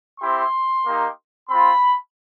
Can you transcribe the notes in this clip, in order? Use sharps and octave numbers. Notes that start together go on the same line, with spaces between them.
C4 E4 G4 C6
A#3 D#4 G4
C4 F4 B5